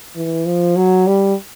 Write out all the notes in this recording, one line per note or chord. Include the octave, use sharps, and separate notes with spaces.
E3
F3
F#3
G3